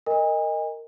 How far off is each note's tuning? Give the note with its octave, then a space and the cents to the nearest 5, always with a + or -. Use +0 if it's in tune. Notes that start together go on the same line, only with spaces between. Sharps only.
A#4 -15 D#5 +0 G#5 -40